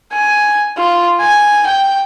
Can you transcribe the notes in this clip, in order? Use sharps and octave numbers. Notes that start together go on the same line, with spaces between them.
G#5
F4
G#5
G5